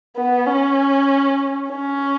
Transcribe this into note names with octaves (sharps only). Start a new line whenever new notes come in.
B3
C#4
C#4